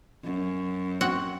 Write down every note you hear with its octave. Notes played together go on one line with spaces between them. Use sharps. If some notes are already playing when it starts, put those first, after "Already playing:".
F#2
C4 F#4 F#5